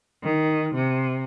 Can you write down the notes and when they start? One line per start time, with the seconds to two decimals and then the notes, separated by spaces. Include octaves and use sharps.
0.24 D#3
0.75 C3